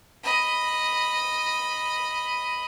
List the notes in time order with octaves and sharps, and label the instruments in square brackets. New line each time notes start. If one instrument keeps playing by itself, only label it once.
[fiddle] D#5 B5